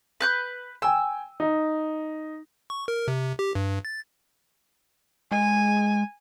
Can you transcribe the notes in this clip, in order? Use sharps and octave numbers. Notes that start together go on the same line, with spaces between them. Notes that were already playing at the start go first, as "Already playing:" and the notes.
B4 F#6 G6
G5 G#5 E6
D#4
C#6
A#4
C3
G4
G2
A6
G#3 G#5